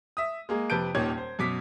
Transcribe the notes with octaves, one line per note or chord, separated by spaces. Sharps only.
E5 D#6
G#3 A#3 G#4
F2 C3 B4 A5 G6 D7
D#1 A#2 D#3 C#5 G#6
C5
F#2 B2 D6 B6